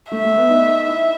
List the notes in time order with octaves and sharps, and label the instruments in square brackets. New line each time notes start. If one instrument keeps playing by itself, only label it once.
[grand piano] A3 [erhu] E5
[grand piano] A3
B3
D#4
E4